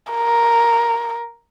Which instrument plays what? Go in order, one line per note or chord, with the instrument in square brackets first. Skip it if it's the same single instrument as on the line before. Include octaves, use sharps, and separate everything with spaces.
[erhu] A#4